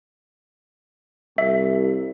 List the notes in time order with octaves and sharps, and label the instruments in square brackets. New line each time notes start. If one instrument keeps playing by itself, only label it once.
[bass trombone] C2 [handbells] E5